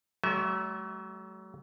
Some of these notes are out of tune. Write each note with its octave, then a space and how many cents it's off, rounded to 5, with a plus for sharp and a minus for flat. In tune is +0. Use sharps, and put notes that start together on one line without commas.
F#3 +35 A3 -35 E5 -20